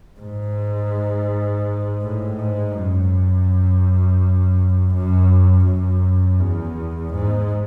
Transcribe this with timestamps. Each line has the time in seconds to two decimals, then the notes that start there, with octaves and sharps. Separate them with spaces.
0.20 G#2
2.02 A2
2.38 G#2
2.75 F#2
4.94 F#2
5.66 F#2
6.40 E2
7.13 G#2